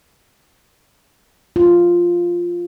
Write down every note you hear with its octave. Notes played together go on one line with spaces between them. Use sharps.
F4